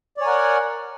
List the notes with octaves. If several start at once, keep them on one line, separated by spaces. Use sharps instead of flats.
A#4 C#5 D5 F#5 G#5